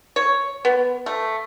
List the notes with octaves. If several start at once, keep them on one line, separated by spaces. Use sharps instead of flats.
C#5
B3
A3